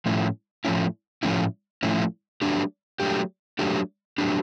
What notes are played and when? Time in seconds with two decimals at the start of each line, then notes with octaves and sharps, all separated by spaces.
0.06 A2 F3 A3 C#4 E4
0.65 A2 F3 A3 C#4 E4
1.23 A2 F3 A3 C#4 E4
1.83 A2 F3 A3 C#4 E4
2.42 F#3 A3 D4 G4
3.00 F#3 A3 D4 G4
3.59 F#3 A3 D4 G4
4.18 F#3 A3 D4 G4